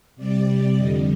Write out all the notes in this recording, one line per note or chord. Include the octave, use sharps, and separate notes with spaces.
C3 G3 D5
F2 D3 G3 D#5